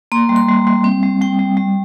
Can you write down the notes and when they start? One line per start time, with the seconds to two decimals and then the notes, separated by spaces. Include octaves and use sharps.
0.12 A#3 C6
0.29 G3
0.36 C6
0.48 G3
0.67 G3
0.84 C4
1.03 G3
1.21 G3 G5
1.39 G3
1.57 G3